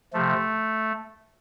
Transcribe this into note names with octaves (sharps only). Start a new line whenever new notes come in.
C3 F3 A3